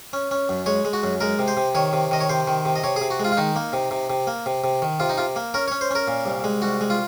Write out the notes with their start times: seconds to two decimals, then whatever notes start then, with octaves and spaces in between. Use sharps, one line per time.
0.13 C#4
0.31 C#4
0.49 F#2
0.66 G#3 C#5
0.85 G#3
0.93 F#4
1.03 F#2
1.21 G#3 A#4
1.39 C3
1.48 C5
1.57 C3
1.75 D#3 C#5
1.93 C3
2.11 D#3 D#5
2.21 C#5
2.29 C3 C5
2.47 D#3
2.65 C3
2.76 D#5
2.83 C3 C#5
2.96 G#4
3.01 C3
3.11 F#4
3.20 G#3 F4
3.32 F4
3.37 D#3 D#4
3.56 A#3
3.73 C3
3.91 C3
4.10 C3
4.27 A#3
4.46 C3
4.64 C3
4.82 D#3
5.00 C3 F4
5.09 D#4
5.18 C3 F4
5.36 A#3
5.54 C#4 A#4
5.68 C#4 C#5
5.81 C5
5.91 C#4 A#4
6.08 A#2
6.26 C2
6.44 G#3
6.62 C2 F#4
6.81 G#3
6.90 F4